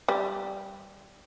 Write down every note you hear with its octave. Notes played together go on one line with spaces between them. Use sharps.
G3